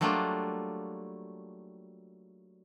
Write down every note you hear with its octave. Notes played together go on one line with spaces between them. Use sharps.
F#3 G3 A3 A#3 D4 F4